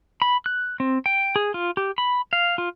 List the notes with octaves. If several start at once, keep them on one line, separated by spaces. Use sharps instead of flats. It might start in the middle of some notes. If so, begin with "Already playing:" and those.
B5
F#6
C4
G5
G#4
F4
G4
B5
F5
F4